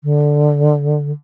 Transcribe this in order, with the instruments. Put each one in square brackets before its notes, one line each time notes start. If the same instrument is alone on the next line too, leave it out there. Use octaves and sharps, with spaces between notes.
[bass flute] D3